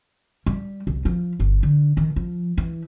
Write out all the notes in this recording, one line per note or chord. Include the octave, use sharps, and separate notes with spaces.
G3
C2
F3
G1
D3
D#3
F3
E3